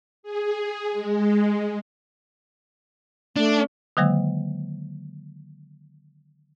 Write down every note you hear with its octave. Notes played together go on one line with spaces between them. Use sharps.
G#4
G#3
A3 D4
D3 D#3 F#3 G#3 A#3